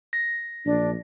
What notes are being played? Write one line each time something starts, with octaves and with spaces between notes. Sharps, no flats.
A#6
A#1 D4